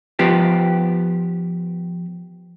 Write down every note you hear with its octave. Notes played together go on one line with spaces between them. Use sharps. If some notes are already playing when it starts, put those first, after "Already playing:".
F3 B3 G4